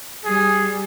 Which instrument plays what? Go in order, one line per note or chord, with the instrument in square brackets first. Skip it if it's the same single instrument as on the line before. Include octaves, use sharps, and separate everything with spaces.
[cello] G3 [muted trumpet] G#4